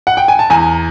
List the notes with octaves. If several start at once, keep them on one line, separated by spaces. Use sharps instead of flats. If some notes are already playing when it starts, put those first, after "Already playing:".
F#5
G5
G#5
A5
E2 G#5 A#5